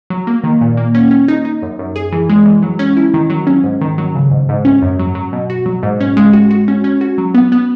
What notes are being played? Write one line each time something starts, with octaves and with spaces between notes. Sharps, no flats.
F#3
A#3
D#3
A#2
A#3
C#4
C#4
D#4
D#4
F#2
F#2
G#4
E3
G#3
E3
F#3
C#4
E4
D#3
F#3
C#4
G#2
D#3
F#3
C#3
G#2
G#2
C#4
F#2
F#3
F#3
B2
F#4
F#3
G#2
C#4
G#3
F#4
F#4
C#4
C#4
F#4
F#3
B3
B3